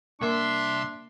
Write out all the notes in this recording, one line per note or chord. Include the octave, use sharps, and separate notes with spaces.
C2 A#3 D4 A#4 E5 C6